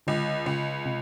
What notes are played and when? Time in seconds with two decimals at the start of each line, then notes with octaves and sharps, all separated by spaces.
0.07 C#2 D3
0.46 C#2 C#3
0.86 C3